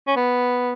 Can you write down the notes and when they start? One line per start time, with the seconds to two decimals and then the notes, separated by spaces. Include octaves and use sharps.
0.07 C#4
0.16 B3